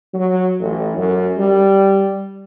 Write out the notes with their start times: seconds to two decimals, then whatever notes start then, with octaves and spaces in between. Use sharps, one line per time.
0.13 F#3
0.60 A1
0.97 F#2
1.37 G3